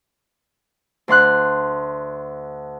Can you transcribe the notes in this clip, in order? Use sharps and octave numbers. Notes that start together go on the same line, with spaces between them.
D2 D4 C6 F#6